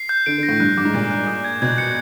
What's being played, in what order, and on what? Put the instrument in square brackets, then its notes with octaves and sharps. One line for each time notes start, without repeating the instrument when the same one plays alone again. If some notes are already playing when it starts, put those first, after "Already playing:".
Already playing: [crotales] C7
G6
[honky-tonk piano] D3 [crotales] D7
[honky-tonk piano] D3 [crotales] A#6
[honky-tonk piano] A2
[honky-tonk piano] G2 [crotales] F#6
[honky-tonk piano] G2 [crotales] D6
[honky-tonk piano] G#2
[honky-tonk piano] A#2 [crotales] F#6
[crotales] F#6
D#6
G#6
[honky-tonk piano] B2 [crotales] G#6
[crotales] C#7